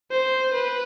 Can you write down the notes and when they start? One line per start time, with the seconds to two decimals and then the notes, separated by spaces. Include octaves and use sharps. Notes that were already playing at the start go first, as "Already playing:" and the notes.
0.11 C5
0.53 B4